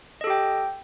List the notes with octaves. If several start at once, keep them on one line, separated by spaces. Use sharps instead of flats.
G4 A4 D#5 G5